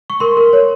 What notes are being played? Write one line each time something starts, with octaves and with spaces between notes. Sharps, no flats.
C#6
A#4 C6
A#4
C#5